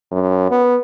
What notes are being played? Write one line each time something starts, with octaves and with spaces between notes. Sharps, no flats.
F#2
B3